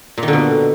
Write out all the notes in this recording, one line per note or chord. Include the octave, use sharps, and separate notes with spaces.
A#2
D#3
D3
B2